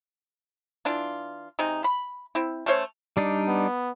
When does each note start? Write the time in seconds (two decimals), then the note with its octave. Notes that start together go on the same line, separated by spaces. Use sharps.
0.85 E3 D4 F4
1.59 C3 G#3 D#4
1.84 B5
2.35 C4 E4
2.66 A3 C#4 C5 C#5
3.17 G3 D4 D#4
3.48 B3